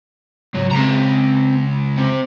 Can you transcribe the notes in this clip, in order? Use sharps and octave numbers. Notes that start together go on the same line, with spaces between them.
C#2 G#2 F#3
C#2 C4 A#5
C3